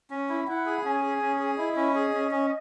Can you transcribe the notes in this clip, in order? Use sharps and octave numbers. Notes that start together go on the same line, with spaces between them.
C#4
E4
E4 F#5
G#4
C#4 G#5
G#4
C#4
G#4
E4 D#5
C#4
G#4
C#4
C#4